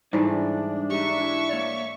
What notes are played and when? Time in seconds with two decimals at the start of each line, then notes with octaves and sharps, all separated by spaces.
0.13 G#2 E3 G3 A3 D4 G#4 D5
0.90 D#4 G4 E5 C#6
1.21 E4
1.49 A#3 C#5 D5